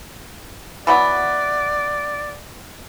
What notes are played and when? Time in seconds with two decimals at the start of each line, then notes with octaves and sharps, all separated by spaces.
0.87 E3 F#3 B3 D5